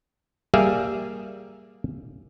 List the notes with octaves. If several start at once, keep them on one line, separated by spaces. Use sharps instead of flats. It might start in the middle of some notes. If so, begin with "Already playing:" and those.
G3 A#3 G#4 D5 E5 F5